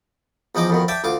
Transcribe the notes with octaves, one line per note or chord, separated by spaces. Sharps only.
E2 F3 D#4 D#5 D6
F2 B2 D#3
D5 E5 G5 A5
D2 F4 D6